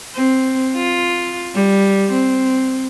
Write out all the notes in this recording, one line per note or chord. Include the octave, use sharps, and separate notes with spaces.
C4
F4
G3
C4